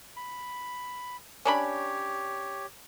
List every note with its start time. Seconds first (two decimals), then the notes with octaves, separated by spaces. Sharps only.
0.17 B5
1.45 C#4 D4 G4 C#5 B5